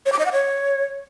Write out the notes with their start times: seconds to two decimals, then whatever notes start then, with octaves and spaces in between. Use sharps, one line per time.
0.06 C#5
0.12 D6
0.19 D#5
0.26 F#5
0.32 C#5